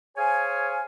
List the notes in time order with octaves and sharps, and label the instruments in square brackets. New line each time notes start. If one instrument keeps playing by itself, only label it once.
[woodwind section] G#4 C5 C#5 F5 G#5